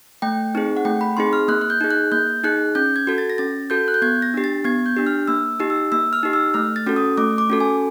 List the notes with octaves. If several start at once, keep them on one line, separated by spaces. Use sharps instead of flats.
A3 G5
C4 D#4 G#4
F#5
A3 G5
B5
C4 D#4 G#4 C6
F6
A#3 F#6
F#6
G6
D#4 G#4
F#6
A#3 G6
D#4 G#4 F#6
C#4 G6
G#6
F#4 A4
A6
A#6
C#4 A6
F#4 A4 G6
F#6
G6
B3 G#6
A#6
D4 G4
A6
B3 G#6
G6
D4 G4
F6
A#3 E6
D#4 G4
E6
A#3 E6
F6
D#4 G4
E6
A3 F6
A6
C#4 F#4 A4
D#6
A3 D6
D6
C#4 F#4 A4
G#5